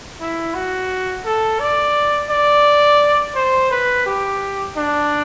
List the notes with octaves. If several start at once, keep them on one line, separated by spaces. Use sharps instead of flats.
E4
F#4
A4
D5
D5
C5
B4
G4
D4